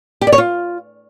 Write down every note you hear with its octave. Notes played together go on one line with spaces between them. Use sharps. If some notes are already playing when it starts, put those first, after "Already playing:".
G4
D5
C#5
F4